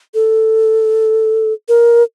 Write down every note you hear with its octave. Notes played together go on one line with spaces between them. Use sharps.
A4
A#4